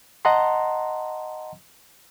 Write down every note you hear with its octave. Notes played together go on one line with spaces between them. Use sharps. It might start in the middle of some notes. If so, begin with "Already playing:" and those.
D#5 F#5 A5 A#5 C6